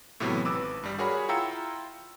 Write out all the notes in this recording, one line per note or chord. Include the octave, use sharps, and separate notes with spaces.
A2 C3 E3 F#3 B3
G#1 B4 D6 E6
G2 G3
F#4 G#4 A#4 C#5 F#5 B5
E4 F4 G5 A#5 E6 C#7